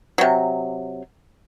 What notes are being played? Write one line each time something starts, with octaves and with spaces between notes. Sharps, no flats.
C3 F#3